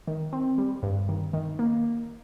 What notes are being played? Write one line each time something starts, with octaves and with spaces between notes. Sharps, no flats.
D#3
C4
G3
G2
D#3
D#3
A#3